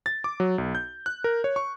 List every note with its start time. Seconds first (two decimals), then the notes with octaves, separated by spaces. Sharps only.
0.06 A6
0.24 D6
0.40 F#3
0.58 B1
0.75 G6
1.06 F#6
1.24 A#4
1.44 C#5
1.56 C#6